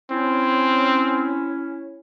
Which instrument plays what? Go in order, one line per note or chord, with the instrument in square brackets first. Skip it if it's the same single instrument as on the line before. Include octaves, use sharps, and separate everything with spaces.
[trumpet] C4 [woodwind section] C#4 E4